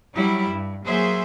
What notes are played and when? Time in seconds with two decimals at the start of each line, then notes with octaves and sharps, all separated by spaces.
0.14 F#3 G3 E4
0.49 G2
0.86 F#3 A#3 G#4 C5 E5